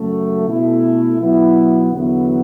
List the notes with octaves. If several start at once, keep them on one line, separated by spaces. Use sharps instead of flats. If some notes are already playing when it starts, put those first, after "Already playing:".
Already playing: F#2 C#3 F#3 A3
B2 A3 E4
B2 F#3 B3 E4
E2 D3 F#3 B3 E4